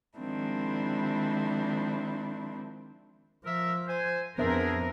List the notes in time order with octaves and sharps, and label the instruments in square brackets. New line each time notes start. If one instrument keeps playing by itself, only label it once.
[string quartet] D#3 F3 G#3 C4 D4 E4
[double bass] F3 [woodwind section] A#4 E5
[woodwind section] C5 G#5
[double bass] F2 [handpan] B3 C5 E5 [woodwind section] D4 G#4 [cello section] A#4